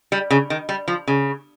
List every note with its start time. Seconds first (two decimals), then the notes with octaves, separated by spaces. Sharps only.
0.12 G3
0.31 C#3
0.50 D#3
0.69 G3
0.88 F3
1.07 C#3